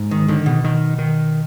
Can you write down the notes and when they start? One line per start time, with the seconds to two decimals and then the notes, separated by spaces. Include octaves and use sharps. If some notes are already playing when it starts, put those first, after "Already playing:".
Already playing: G#2
0.11 D#3
0.28 D3 D#3
0.46 B2
0.64 D#3
0.98 D#3